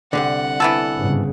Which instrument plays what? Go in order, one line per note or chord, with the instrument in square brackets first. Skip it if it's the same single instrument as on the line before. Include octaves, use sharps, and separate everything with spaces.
[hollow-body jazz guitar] C2 F#2 D3 [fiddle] F#5
[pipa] E3 B3 A4
[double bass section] G1 G#2 C#3